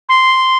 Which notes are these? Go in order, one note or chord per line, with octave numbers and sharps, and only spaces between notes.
C6